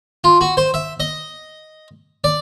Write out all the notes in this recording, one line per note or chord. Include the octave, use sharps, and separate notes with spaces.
F4
F#4
C5
E5
D#5
D5